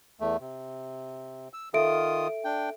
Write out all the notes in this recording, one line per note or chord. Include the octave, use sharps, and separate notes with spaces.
E2 A3
C3
E6
D#3 F4 A4 E5 D#6 D7
D4 G5